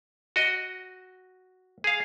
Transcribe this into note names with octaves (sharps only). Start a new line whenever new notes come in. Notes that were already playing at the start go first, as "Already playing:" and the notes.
F#4 D#5
G#4 F5